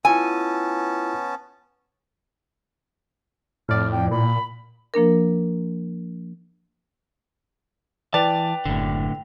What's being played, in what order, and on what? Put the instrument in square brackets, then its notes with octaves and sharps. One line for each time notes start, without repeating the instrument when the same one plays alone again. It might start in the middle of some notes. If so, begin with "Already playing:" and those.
[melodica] B3 C#4 A5 [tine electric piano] E4 F4 E6 [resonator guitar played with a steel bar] G#5
[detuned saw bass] F2 [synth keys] A2 D5 [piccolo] F6
[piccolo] G5
[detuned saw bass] A#2 [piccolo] B5
[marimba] F3 A#3 D4 A#4
[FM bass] E3 [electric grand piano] B4 D5 [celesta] G5 F7 [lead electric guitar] A5
[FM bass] F#1 [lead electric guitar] A2 D3